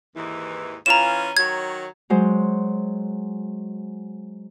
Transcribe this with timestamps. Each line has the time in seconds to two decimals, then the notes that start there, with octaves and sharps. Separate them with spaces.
0.15 D#2 G#2 E3
0.86 E3 C#4 F4 A#5 E7
1.37 D#3 F#3 C#5 G#6
2.10 F#3 G#3 C5